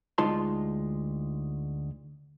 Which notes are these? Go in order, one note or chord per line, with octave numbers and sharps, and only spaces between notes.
D2 G#3 D#4 F4 A5 C6